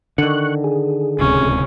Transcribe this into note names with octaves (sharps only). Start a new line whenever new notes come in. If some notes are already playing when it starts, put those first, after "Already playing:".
D3 D#3 C#6 F#6
G#4
D1 C#2 C3 C#4